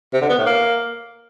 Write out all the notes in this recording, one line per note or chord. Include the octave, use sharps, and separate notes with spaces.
C3
D3
B3
A2
A#3